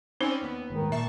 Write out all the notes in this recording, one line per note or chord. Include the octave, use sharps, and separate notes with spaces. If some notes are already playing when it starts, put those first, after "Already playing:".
C4 C#4 D#4 C5 D5
D#2 B3
D#1 G#2 D#3
A#2 E5 A5 C#6